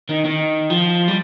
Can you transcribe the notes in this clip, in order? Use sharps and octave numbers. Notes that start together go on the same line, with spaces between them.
D#3
D#3
F3
G3